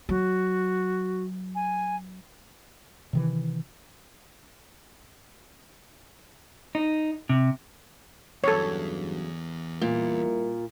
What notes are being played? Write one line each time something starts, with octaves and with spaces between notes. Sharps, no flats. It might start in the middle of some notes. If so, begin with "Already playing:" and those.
F#3 F#4
G#5
C3 D#3 E3
D#4
C3
E2 G2 C#3 F#3 A4 C#5
A#2 G3 E4 A#4